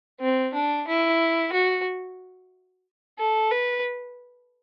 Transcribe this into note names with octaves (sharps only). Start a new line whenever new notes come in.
C4
D4
E4
F#4
A4
B4